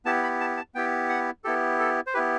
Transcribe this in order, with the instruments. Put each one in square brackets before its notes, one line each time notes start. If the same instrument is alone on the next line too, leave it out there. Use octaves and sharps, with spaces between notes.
[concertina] B3 E4 G4 A5
B5
A5
A5
B3 E4 G4 G5
F#5
B3 E4 G4 A4
A4
C5
B3 E4 G4 B4